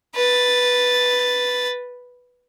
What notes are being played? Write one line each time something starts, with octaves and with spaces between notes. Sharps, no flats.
B4 A6